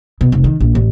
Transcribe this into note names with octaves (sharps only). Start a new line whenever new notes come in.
B2
F1
D#3
A#1
A1